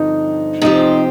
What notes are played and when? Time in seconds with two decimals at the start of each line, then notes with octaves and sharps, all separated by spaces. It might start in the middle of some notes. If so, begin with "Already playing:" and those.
Already playing: G2 D3 F3 C4 D#4 F4
0.62 C3 F3 C4 D#4 G4